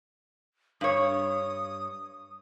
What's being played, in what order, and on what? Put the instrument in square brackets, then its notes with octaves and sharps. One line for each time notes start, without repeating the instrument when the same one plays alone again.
[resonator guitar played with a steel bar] G2 C#5 [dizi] D#6